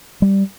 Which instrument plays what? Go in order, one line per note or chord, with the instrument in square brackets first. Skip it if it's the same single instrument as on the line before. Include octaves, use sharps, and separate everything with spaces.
[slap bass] G3